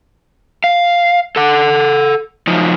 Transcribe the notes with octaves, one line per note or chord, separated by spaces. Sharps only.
F5
A4 F#5
F3 F#3 D#4 F4